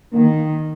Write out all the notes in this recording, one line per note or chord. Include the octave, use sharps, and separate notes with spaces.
D#3 A#3